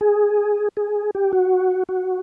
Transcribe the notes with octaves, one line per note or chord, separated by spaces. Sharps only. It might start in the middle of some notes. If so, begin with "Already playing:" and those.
G#4
G#4
G4
F#4
F#4